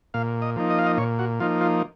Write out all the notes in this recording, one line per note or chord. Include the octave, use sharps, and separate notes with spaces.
A#2 F5
D#5
F3 A#3 D#4
D#5
F5
D#5
A#2 C#5
F#4
F3 A#3 D#4 F4
F4